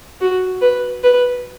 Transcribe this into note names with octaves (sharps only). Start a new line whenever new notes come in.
F#4
B4
B4